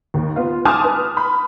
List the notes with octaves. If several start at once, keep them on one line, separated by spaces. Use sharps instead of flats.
D#2
B3 F4
G#5 A5 C6 D6 D#6 F6
B4
B5